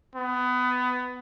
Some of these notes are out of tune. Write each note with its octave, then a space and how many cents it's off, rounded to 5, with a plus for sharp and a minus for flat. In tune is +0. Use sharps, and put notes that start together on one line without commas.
B3 +20